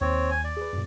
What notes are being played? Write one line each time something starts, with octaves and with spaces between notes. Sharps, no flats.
D#2 C4 C#5
G#5
D5
G#4 B4
F#2 A#2